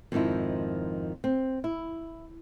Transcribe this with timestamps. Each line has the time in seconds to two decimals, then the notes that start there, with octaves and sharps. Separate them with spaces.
0.12 F2 G#2 D#3 F3 E4
1.24 C4
1.64 E4